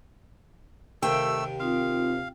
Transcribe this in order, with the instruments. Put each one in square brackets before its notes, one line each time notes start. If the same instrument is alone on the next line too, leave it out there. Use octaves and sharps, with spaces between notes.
[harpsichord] D#2 C3 [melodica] A3 E6 [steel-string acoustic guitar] G5
[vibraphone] C4 D#4 F4 [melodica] F5